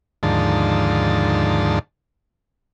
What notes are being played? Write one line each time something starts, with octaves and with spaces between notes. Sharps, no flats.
D#2 G#2 D3 F3 A5